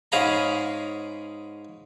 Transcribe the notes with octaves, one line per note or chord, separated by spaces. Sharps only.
G#2 C#4 G#4 F5 A#5 B5